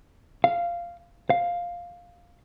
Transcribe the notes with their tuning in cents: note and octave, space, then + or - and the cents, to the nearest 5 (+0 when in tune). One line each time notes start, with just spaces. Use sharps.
F5 -10
F5 +5